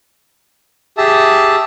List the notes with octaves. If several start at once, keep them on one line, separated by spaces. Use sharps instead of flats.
G4 G#4 E5 A5